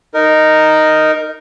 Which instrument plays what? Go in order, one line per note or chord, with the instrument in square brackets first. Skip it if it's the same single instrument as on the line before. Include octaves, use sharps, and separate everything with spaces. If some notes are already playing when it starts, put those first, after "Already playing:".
[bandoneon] D#4 A#4